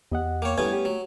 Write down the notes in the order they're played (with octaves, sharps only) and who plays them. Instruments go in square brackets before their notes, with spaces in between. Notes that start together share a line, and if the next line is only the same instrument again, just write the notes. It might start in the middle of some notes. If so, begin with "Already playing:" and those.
[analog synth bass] E2 [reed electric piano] G4 D#5 F#5
[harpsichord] A#3 C#5 [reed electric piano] G5 D6
[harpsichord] G2 B3 C#4 [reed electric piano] G3 E4 G#6 [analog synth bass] A3
[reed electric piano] G4
[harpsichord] F#3